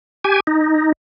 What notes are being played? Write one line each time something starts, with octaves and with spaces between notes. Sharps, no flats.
G4 G#5
D#4